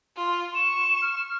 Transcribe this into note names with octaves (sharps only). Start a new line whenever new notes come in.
F4
C#6 E7
F6